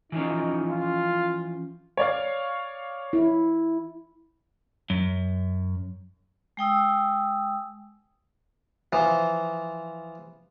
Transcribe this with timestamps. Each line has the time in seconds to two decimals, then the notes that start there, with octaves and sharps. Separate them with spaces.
0.12 E3 F3 C#4 D#4
0.69 F4
1.97 C#5 D5 F5
3.13 E4
4.90 F#2
6.57 G#3 G5 D#6 E6
8.93 E3 F3